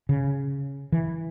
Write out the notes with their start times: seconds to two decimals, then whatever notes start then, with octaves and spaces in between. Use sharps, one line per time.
0.09 C#3
0.92 E3